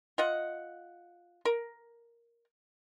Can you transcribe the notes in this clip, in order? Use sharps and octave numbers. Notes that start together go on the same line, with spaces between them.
F4 D#5 F#5
A#4